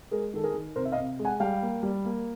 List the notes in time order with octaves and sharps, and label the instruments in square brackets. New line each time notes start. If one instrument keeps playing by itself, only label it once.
[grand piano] G#3 G#4 A#4
D#3 A4
G#4 A#4
D#3
C3 A#4 C5
E5
D#5 F5
C3
G#3
F#5 G#5
G3 F5 G5
A#3
G3
A#3